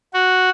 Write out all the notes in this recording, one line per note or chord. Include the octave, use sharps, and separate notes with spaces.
F#4